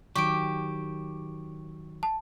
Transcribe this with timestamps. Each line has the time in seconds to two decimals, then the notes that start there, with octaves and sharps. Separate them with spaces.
0.16 D#3 F#3 G4 C#6 D7
2.03 A5